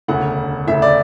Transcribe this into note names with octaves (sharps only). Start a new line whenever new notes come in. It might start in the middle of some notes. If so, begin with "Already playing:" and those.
E1 D2 C#3 F#5
E1 D2 C#3 E5
D5